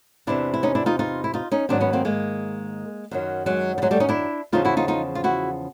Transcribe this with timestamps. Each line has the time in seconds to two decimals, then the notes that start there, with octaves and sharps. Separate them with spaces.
0.27 E2 C3 E3 D4 E4
0.54 E4
0.63 C#4 D#4
0.75 D4 E4
0.86 D#4 F4
0.99 D#4 F4
1.24 E4
1.34 D#4 F4
1.52 C#4 D#4
1.69 G#2 D#3 F#3 C4 D4
1.81 B3 C#4
1.93 A#3 C4
2.05 G#3 A#3
3.11 F#2 D#3 F#3
3.46 F#3 G#3
3.78 G3
3.82 F#3 G#3
3.91 G3 A3
4.00 C#4 D#4
4.09 D4 E4
4.52 E2 C#3 F3 D#4 F4
4.65 E4 F#4
4.77 D#4 F4
4.88 D#4 F4
5.15 F4
5.24 E4 F#4